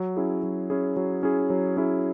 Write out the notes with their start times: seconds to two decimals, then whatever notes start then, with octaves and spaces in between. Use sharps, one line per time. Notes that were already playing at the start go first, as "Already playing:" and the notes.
Already playing: F#3
0.17 C#4 E4 G#4
0.43 F#3
0.70 C#4 E4 G#4
0.97 F#3
1.23 C#4 E4 G#4
1.50 F#3
1.77 C#4 E4 G#4